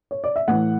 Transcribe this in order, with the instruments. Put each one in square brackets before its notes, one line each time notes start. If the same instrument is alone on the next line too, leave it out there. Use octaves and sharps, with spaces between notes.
[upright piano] C#5
D5
E5
A2 E3 F#5